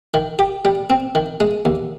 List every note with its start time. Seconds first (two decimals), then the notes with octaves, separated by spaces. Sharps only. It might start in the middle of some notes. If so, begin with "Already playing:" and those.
0.14 D#3
0.39 G4
0.65 G3
0.90 C4
1.15 D#3
1.40 G#3
1.65 D#2